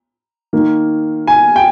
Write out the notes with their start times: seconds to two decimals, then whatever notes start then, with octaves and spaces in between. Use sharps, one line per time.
0.53 D#3 A#3
1.27 G#5
1.56 G5